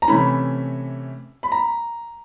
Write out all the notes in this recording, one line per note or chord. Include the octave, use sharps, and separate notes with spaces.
A#5
C3 E3 A3 C#4 B5
B5
A#5